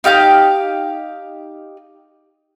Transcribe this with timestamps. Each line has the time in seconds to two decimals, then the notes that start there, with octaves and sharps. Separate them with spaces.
0.04 D#4 G4 F5 G6